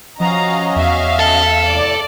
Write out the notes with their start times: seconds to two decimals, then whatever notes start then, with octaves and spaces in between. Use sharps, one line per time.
0.20 F3 C#4 F#4 D#5 F5 A#5
0.76 E2 E5 F5
1.19 A4
1.65 A2 C3 D5